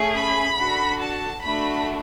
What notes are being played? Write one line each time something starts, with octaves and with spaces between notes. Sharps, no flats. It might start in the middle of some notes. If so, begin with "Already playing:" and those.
Already playing: A3 C#4 G#4
B5
D4 F#4 A4
A5
A3 D4 F#4 B5